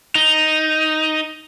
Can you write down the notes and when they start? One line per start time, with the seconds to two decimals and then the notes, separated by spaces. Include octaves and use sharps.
0.15 D#4